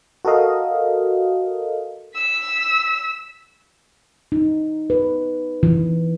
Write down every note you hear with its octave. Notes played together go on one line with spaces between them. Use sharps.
F#4 A4 A#4 D#5 F5
E6 B6
D#4
B4
E3